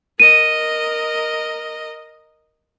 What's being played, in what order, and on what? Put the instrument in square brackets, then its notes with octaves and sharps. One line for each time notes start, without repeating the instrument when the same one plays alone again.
[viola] A#4 D#5 [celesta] D#7